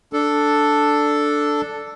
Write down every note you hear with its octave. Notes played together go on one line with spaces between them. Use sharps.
D4 A4